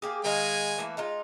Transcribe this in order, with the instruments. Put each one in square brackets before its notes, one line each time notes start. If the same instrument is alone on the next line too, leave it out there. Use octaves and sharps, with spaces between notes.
[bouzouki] A#3 G4 G#4
[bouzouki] D#3 D#5 F5 [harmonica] G#3 G#5
[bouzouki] E3 A3 A#3
G#3 D#4 F4